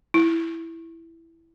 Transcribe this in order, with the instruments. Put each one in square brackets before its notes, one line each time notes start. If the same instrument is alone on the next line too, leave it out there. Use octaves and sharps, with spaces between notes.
[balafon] E4